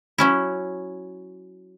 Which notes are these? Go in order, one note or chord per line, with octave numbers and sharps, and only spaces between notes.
F#3 C#4 E4